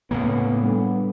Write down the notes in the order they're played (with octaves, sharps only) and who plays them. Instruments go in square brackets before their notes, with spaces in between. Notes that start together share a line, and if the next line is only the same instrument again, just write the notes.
[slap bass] A2 C#3 A#3 [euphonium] B3
[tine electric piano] G3 D4 A4